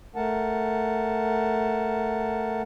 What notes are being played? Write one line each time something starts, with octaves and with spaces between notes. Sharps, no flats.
A3 A#4 F#5 A5